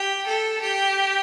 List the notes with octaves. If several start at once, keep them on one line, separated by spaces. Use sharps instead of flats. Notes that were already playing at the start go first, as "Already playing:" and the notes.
Already playing: G4
A4
G4